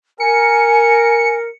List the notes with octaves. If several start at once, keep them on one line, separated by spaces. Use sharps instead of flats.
A#4 G#5 C#7